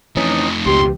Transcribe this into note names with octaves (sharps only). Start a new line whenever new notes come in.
F2 E3 A3 C#4 D#4
C#2 B2 G4 C6